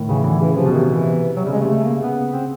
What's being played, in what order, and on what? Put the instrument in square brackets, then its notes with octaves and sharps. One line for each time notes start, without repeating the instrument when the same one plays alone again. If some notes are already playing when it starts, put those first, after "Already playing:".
Already playing: [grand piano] A2 D#3
[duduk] C#3 [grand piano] E3
[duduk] D3 [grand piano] E3
[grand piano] C#3 [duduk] E3
[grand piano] C3 [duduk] F3
[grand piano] B2
[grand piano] C3 [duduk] D#3
[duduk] E3
[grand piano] C3 [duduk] F#3
[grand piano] C#3 [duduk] G3
[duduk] G#3
[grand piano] C3 [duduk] A3
[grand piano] C#3 [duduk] A3
[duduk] A#3
[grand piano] C#3 [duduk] B3
[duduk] C4